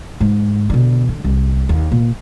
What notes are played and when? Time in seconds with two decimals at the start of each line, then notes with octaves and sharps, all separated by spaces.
0.20 G#2
0.70 B2 D3
1.09 D3
1.24 C2
1.69 D#2
1.92 A#2